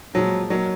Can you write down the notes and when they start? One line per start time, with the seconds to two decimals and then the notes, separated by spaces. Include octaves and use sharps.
0.14 A#2 F3 F#3 G#3
0.50 F#3 A#3 D#4 A#4 C#5